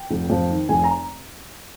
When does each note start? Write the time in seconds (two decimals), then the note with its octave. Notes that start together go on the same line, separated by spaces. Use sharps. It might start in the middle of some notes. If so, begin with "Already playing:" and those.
Already playing: G5
0.11 F1
0.30 F2
0.49 D#3
0.69 F1 G#5
0.84 A#5